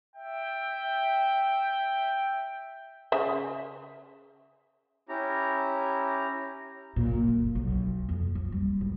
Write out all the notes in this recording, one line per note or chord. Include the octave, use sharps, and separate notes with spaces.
E5 G5
C#3 E5
C#4 E4 G4 A#5
A#2
F1
B1
F2
F3
G3
G#1